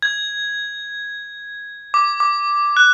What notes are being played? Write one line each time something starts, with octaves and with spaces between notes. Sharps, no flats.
G#6
D6
D6
F#6